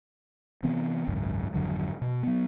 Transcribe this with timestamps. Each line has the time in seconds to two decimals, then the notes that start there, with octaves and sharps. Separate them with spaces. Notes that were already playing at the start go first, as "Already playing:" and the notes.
0.63 C3 E3 B3 C4
1.07 G#1 C#2 F#2
1.54 G#1 F2 D3 F#3
2.02 B2
2.23 F#3 B3